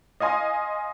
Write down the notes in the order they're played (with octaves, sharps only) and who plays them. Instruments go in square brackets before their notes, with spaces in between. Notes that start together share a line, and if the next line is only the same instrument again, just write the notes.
[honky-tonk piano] D#5 F5 G#5 C6